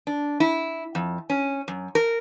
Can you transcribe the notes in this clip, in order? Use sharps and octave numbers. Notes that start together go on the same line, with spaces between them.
D4
E4
F2
C#4
F#2
A#4